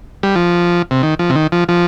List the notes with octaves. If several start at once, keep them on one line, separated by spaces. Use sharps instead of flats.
G3
F3
C3
D#3
F3
C3
D#3
F3
F3